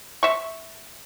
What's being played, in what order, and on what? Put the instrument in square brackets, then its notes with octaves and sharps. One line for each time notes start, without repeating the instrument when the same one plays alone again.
[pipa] E5 C#6